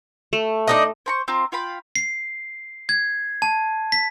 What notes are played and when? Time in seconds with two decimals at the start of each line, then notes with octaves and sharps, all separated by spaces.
0.33 A3
0.67 D4 D#4 D#5
1.06 C5 A#5 C#6
1.28 C4 F4 A#5
1.52 F4 F5 G5 B5
1.96 C7
2.89 G#6
3.42 A5
3.92 B6